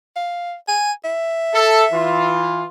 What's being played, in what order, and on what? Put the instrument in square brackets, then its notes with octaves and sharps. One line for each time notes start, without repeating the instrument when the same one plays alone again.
[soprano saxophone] F5
G#5
E5
[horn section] A4
E3 F4